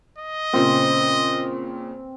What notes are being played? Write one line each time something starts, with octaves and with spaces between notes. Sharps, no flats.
D#5
A#2 C#3 C4